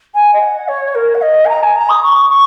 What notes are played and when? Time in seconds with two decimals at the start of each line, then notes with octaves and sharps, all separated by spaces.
0.14 G#5
0.33 D#5
0.41 F#5
0.68 C#5
0.95 A#4
1.14 F#5
1.22 D#5
1.45 G#5
1.49 A#5
1.63 G#5
1.76 A#5
1.89 D#6
2.03 C#6
2.30 C#6